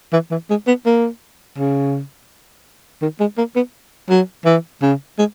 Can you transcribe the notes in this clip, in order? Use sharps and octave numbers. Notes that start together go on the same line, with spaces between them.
E3
E3
G#3
B3
A#3
C#3
D#3
G#3
A#3
B3
F#3
E3
C#3
G#3